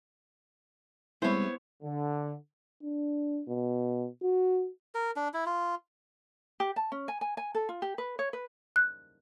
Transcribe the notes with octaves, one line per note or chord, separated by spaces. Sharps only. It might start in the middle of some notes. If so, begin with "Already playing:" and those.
G3 G#3 B3 C4 E4 C5 C#5
D3
D4
B2
F#4
A#4
D4
E4
F4
G4
A5
C#4
G#5
G#5
G#5
A4
F4
G4
B4
C#5
B4
F#6